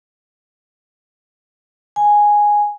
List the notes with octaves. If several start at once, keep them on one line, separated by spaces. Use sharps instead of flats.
G#5